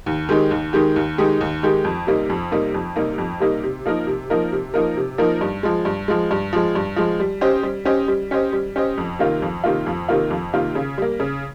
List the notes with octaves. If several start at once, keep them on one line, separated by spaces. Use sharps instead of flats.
D#2
D#3 G#3 D#4 G4
D#2
D#3 G#3 D#4 G4
D#2
D#3 G#3 D#4 G4
D#2
D#3 G#3 D#4 G4
F2
C3 G3 A#3 D#4
F2
C3 G3 A#3 D#4
F2
C3 G3 A#3 D#4
F2
C3 G3 A#3 D#4
C3
F3 A#3 D#4 A#4
C3
F3 A#3 D#4 A#4
C3
F3 A#3 D#4 A#4
C3
F3 A#3 D#4 A#4
G2
F3 G#3
G2
F3 G#3
G2
F3 G#3
G2
F3 G#3
G3
C#4 G4 C5 D#5
G3
C#4 G4 C5 D#5
G3
C#4 G4 C5 D#5
G3
C#4 G4 C5 D#5
F2
C3 D#3 A#3 F4
F2
C3 D#3 A#3 F4
F2
C3 D#3 A#3 F4
F2
C3 D#3 A#3 F4
C#3
G3 A#3
C#3